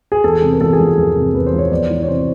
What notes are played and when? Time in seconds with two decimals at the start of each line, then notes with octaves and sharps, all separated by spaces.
0.12 G#4
0.24 E2 A4
0.42 C3
0.53 A#4
0.61 E2 A4
0.73 G#4
0.79 F3
0.97 E2 A#4
1.16 C3
1.34 E2 B4
1.47 C5
1.53 F3
1.59 C#5
1.71 B3 D5
1.90 E3
2.03 C#5
2.07 C3 C5